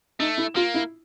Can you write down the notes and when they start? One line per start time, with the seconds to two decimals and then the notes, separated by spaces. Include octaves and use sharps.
0.19 A3 D#4
0.38 E4
0.56 A#3 F4
0.74 E4